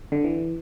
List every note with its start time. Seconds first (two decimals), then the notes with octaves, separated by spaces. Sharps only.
0.12 D3
0.24 E3